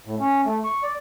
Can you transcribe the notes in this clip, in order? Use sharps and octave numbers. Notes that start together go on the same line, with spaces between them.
A2
C#4
A3
C#6
D5